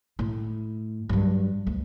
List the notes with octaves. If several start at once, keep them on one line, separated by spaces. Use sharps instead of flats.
A2
G2 F#3
D2